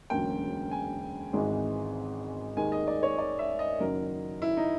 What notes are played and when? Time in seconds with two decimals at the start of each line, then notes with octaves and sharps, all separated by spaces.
0.10 E1 D2 C#3 F#3 A#3 G5
0.71 G#5
1.33 G#1 G#2 E3 G#3 C4
2.57 D#2 D#3 G#3 G#5
2.72 D#5
2.87 D5
3.03 C#5
3.18 D5
3.39 E5
3.59 D#5
3.80 F#1 F#2 D#3 F#3 A#4
4.42 E4
4.57 D#4